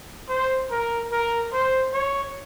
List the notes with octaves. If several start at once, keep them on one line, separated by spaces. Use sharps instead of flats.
C5
A#4
A#4
C5
C#5